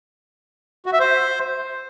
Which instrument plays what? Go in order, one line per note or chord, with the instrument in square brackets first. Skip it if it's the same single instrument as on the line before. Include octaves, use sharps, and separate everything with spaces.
[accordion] F#4
E5
C5